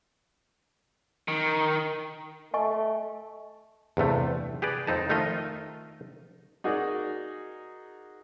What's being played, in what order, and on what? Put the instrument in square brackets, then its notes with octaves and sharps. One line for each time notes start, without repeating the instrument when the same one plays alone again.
[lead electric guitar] D#3
[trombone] A3 [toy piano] D#5 G#5 C#6
[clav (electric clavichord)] E2 G2 C3 A3
G4 G#4 B4 D5
F2 C4 D#4 A5
D#3 A3 D#4 F4 D#5
[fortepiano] D#4 F#4 G#4 A#4 D5